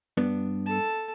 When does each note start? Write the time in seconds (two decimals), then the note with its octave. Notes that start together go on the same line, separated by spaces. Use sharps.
0.17 G2 B3 D4
0.66 A4 A5